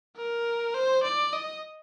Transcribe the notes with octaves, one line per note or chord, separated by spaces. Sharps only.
A#4
C5
D5
D#5